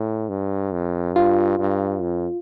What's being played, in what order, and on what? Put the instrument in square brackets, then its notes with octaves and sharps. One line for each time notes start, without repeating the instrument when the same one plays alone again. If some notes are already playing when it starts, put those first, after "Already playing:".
Already playing: [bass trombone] A2
G2
F2
[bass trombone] G2 [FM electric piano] F4
[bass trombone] G2
F2